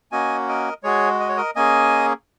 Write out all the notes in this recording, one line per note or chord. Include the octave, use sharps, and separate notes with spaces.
A#3 C#4 F#4 D#5 G#5
A#4 D#5
G#3 F#4 G#4 C#5
D#5
C#5
A#4 D#5
A#3 C#4 G#4 D#5 G#5